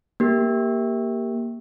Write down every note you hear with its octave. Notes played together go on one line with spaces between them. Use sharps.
A#3 G4